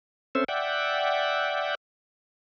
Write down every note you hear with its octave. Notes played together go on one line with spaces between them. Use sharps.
C4 C#4 A4 C5 E5
D5 E5 F#5 G5